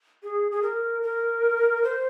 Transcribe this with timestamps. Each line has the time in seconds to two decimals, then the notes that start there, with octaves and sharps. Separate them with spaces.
0.23 G#4
0.52 G#4
0.62 A#4
1.02 A#4
1.84 C5